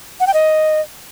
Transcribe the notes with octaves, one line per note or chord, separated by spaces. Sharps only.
F#5
G5
D#5